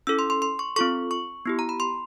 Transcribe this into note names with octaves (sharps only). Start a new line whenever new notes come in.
C#4 E4 A4 E6
C6
C6
C6
C#6
C4 F4 A4 C#6
C#6
B3 E4 G4
A#5
B5
C6